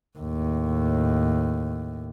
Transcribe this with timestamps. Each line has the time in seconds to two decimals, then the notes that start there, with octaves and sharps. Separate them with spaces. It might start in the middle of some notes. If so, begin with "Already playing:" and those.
0.18 D#2 A2